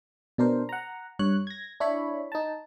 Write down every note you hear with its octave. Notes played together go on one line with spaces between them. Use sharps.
B2 D4 A#4 C5
F#5 A#5
G2 C#5 F#6
G#6 A#6
D4 E4 C#5 B5
D#4 A5